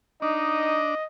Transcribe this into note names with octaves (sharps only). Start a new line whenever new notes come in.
D4 D#4 D#5